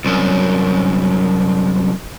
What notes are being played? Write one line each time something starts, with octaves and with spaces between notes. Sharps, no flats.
C2 F#2